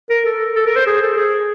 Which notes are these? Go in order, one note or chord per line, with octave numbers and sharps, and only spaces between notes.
A#4
A4
A4
A#4
C5
G#4
A4
G#4